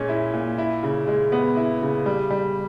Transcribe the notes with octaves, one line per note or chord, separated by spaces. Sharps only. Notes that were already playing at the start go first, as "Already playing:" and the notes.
Already playing: A#2 G#3 C#4
E4
A#2
E4
C#3
G#3
B3
E4
C#3
G3
G3